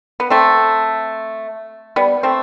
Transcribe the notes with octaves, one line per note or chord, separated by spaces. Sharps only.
B3
A3 C4
G3 B3
A3 C4